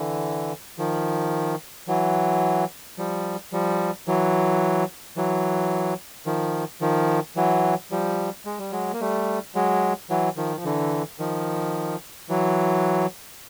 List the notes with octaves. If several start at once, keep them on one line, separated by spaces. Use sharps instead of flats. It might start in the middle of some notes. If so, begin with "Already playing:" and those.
Already playing: D3 E3
D#3 F3
E3 F#3
F3 G3
F3 G3
E3 F#3
E3 F#3
D#3 F3
D#3 F3
E3 F#3
F3 G3
G#3
G3
F#3 G#3
A#3
G3 A3
F#3 G#3
E3 F#3
D#3 F3
F3
D3 E3
D#3 F3
E3 F#3